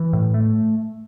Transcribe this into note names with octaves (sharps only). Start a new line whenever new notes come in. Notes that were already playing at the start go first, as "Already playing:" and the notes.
Already playing: E3
A2
A3